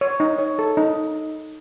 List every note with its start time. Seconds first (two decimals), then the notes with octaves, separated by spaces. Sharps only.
0.01 C#5
0.20 D#4
0.39 C#5
0.59 A4
0.77 D#4